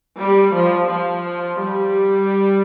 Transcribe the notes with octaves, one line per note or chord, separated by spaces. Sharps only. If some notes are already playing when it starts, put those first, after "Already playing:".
G3
F3
F3
G3